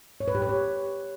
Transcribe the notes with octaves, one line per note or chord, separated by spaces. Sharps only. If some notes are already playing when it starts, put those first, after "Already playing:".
C#5
B4
G4
B4
C#5